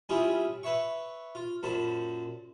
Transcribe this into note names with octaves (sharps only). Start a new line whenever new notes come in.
G3 C#4 E4 F4 G4 G#4
B4 C#5 E5 C#6
F4
F#2 A#2 C5 A5 B5